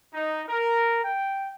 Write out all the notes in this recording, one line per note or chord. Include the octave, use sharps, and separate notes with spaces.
D#4
A#4
G5